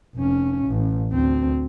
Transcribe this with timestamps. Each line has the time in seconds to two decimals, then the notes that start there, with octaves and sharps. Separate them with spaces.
0.16 F1 C#4
0.67 A1
1.11 D2 C4